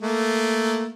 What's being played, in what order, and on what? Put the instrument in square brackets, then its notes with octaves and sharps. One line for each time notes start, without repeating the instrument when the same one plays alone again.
[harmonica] A3 A#3